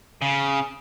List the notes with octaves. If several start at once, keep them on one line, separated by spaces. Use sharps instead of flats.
C#3